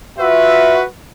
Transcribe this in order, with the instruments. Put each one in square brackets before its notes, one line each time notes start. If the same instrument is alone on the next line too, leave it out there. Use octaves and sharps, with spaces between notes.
[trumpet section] F4 E5 [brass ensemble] F#4 B4